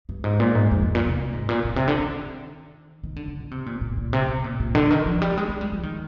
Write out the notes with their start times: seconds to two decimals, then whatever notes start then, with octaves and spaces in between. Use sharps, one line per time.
0.09 G2
0.24 G#2
0.40 A#2
0.55 G#2
0.71 F2
0.82 G2
0.95 A#2
1.06 C3
1.17 C3
1.33 G#2
1.49 A#2
1.65 A#2
1.76 C3
1.88 D3
1.99 D#3
3.04 D#3
3.16 D3
3.28 D3
3.40 D3
3.51 C3
3.66 A#2
3.81 A#2
3.97 A#2
4.13 C3
4.29 C3
4.44 A#2
4.60 A#2
4.75 D3
4.91 D#3
5.06 F3
5.22 G3
5.38 G#3
5.49 G#3
5.61 G3
5.72 F3
5.83 D#3